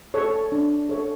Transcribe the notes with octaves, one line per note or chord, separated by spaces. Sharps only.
A4 C#5
D4
A4 C#5